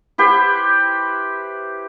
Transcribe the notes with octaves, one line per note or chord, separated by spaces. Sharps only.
E4 G4 B4 C5